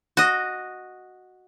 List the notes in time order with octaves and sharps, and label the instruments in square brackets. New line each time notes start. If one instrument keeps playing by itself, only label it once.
[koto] F#4 D#5